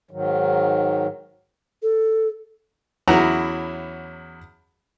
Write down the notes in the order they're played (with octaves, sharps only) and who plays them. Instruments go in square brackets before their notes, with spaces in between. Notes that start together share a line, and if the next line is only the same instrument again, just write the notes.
[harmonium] G#2 D#3 F#3
[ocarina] A4
[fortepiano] E2 F#3 C#4 E4 F#5 A#5